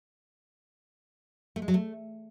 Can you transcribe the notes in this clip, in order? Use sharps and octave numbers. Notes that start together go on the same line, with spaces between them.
A3
G#3
F#3
A3